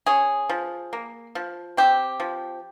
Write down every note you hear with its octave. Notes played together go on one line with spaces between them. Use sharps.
C#4 G#4
F3
A#3
F3
C4 G4
F3